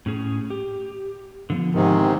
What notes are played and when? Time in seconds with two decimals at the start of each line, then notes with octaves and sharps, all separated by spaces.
0.06 A2 C#4 G#4
0.50 G4
1.50 D3 F3 B3
1.75 G#2 C3 D#3